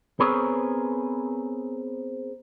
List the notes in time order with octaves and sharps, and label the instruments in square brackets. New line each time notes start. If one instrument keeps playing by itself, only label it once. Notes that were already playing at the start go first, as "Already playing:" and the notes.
[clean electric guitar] B3 C4 G#4 A#4 B4 C#5